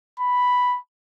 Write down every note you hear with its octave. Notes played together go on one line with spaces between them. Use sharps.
B5